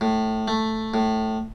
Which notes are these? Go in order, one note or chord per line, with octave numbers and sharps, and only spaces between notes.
A2
A3
A2